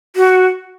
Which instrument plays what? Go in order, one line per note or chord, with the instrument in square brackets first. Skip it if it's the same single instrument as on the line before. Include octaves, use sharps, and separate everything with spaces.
[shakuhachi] F#4